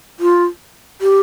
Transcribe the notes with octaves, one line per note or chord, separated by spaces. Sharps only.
F4
G4